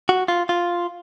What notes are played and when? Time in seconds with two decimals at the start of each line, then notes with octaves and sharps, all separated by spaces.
0.09 F#4
0.28 F4
0.49 F4